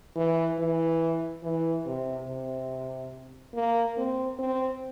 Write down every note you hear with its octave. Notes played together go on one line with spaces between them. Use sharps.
E3
E3
E3
C3
C3
A#3
C4
C4